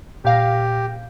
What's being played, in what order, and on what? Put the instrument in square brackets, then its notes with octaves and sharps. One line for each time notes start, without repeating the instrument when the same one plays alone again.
[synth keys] A#2 F5 A#6 [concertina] G4